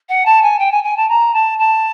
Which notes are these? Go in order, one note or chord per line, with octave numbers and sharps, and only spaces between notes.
F#5
A5
G#5
G5
G#5
G#5
A5
A#5
A5
A5